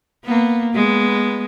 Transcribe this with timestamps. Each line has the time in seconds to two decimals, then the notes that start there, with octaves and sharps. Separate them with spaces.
0.24 A#3 B3
0.73 G#3 B3